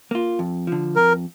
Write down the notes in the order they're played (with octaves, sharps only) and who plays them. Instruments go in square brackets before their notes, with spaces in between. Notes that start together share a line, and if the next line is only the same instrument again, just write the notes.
[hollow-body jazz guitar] A#3 F4
F2
D3 F3
[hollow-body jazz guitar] F2 [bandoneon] A#4